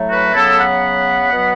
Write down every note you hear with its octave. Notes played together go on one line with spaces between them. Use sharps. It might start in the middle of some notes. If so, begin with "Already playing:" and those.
Already playing: A2 F#3 A3
F#4 B4
C#3 F#3 B3 E4 A4
F#5 B5
B2 F#3 B3